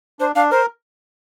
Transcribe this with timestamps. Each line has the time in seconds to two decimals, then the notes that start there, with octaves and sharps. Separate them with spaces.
0.20 D4 C5
0.36 D4 F5
0.51 A#4 C5